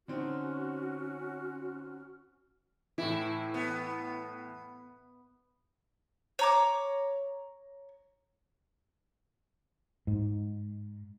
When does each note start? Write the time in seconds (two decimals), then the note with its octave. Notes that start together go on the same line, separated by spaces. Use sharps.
0.08 D3 C4 C#4 D#4 F#4 F6
2.98 A2 E3 E4
3.54 B3
6.39 C#5 A#5 D6
10.07 G#2